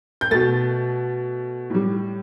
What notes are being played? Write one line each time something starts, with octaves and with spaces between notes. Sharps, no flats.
G6
B2 A3 A6
A2 G3